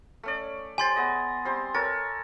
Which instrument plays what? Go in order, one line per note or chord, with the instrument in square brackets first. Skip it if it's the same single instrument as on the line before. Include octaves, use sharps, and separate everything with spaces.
[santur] A3 C#4 D5
[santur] G4 C5 [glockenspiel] G#5 C6 A6
[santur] B3 G#4 D#5
G3 C4 C5
[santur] A4 A#4 C#5 [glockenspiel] A6